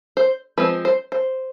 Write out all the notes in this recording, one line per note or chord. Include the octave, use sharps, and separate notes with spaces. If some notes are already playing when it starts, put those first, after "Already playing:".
C5
F3 G#3 C4 B4
C5
C5